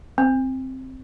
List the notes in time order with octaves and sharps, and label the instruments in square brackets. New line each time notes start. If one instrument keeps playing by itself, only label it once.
[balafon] C4